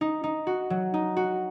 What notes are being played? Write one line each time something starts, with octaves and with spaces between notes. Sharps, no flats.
D#4
D#4
F#4
F#3
D#4
F#4